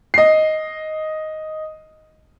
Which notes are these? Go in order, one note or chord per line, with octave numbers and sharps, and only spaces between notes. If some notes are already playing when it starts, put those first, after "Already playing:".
D#5 C7